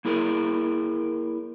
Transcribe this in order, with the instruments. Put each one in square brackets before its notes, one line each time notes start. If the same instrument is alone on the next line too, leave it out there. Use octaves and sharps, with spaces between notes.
[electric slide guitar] A#3 E4 G#4 A#4